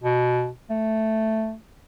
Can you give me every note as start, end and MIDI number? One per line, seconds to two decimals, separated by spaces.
0.03 0.48 47
0.70 1.54 57